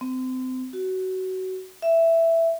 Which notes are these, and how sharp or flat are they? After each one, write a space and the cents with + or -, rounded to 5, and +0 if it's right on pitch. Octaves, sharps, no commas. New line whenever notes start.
C4 -30
F#4 +20
E5 +5